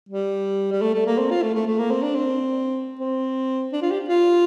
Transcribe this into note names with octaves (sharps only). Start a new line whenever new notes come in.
G3
G3
A3
A3
A#3
C4
F4
A3
A3
A3
A#3
C4
D4
C4
C4
D4
F4
G4
F4